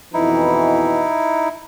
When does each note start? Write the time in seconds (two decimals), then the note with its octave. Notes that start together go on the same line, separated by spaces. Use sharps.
0.14 F2 B2 E3 D#4 E4